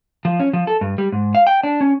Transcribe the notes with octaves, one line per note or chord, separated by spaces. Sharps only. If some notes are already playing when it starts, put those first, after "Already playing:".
F3
C#4
F3
A4
G2
G3
G#2
F5
G5
D4
C#4